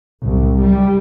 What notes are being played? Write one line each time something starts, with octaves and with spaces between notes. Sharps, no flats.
C2
G3